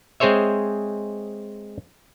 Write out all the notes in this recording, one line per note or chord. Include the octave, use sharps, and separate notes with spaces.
G#3 C4 G#4 C5 C#5 E5